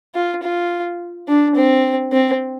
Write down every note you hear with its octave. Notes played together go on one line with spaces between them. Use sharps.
F4
F4
D4
C4
C4